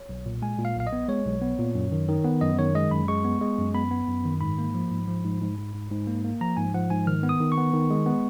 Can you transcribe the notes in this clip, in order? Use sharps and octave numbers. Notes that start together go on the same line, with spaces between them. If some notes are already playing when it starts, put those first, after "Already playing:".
Already playing: C#5
B1
A#2
G#3 G#5
A#2
F5
B1 F5
D#5
B3
G#3 C#5
B1
B3
A#2
F#2
D#3
D#3
B3
F#2 D#5
D#3 C#5
G#3 D#5
F#2 B5
G#3 C#6
B3
G#3
F#2
B3 B5
B3
F#2
D#3
G#2 B5
A#3
F3
G#2
F3
G#2
G#2
G#2
G#2
G#2
A#3
A#3
F3 A#5
G#2 G#5
F3 F#5
G#2 G#5
D#3 F6
B3
D#6
D#3
C#6
B3
D#3
G#3
B3